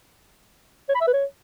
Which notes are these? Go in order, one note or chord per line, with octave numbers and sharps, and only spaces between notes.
C#5
B5
E5
B4
C#5